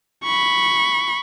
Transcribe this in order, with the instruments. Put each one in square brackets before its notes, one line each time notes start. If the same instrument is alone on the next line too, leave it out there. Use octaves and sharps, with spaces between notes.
[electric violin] B5 C#6